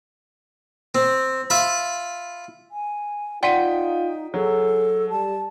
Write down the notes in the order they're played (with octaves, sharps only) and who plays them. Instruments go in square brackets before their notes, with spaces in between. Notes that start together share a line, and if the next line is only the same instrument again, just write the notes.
[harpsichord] C4
F4 E5 B5
[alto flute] G#5
[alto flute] D#4 [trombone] F4 [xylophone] D5 F#5 C6 [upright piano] G5 B6 D#7
[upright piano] F#3 [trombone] G#4 [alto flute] A4
[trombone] G3 [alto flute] A5